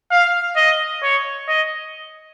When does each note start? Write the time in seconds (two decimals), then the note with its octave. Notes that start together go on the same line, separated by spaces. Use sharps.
0.11 F5
0.56 D#5
1.03 C#5
1.48 D#5